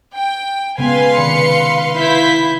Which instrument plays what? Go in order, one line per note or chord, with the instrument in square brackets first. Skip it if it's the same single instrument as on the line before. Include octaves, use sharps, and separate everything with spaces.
[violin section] G5
[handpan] C#3 G#3 B3 [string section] B4 F5 C6 [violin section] G#5
[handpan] C3 D#3 D5 [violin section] C#7
[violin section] E4 G6 B6